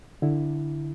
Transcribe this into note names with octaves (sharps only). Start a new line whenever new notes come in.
D3 E4